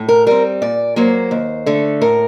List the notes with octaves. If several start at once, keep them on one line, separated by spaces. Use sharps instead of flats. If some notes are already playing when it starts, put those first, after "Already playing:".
Already playing: A2
A#4
G3 C4 A#4
A#2 D5
F#3 A#3 C5
D#2
D3 A3
A2 A#4